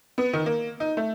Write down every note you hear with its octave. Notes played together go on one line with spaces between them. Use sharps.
B3
D#3
A#3
D#4
A3